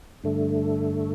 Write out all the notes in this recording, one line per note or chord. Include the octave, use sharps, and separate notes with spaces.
G2 D3 A3